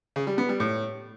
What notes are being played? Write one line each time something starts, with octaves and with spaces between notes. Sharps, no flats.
C#3
G3
B3
G3
A2